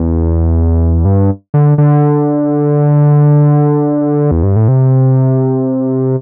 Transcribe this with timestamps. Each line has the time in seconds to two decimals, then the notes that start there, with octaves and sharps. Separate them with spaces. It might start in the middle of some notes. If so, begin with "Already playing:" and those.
Already playing: E2
1.05 G2
1.54 D3
1.78 D3
4.31 E2
4.43 G2
4.56 A2
4.68 C3